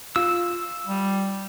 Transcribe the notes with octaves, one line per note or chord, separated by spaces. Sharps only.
F4 E6
G3